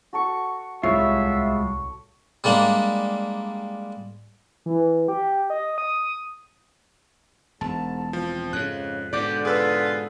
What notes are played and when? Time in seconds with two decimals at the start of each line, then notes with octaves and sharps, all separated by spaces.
0.13 F#4 A4 C#6
0.83 D1 C2 G3 G#3 F4 C#5 E5
2.44 G3 G#3 A#3 D4
4.66 E3
5.08 G4
5.50 D#5
5.78 D#6
7.61 E1 G#2 A5
8.13 F3 C4
8.53 F2 G#2 C#3 F#6
9.13 G#2 B2 D3 G4 D5 D6
9.45 F4 G#4 B4 E6